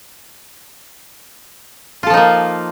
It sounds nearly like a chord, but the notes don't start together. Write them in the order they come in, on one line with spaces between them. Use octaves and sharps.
F4 A4 F3 D#4 A#3